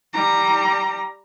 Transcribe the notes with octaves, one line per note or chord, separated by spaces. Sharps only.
G3 A#5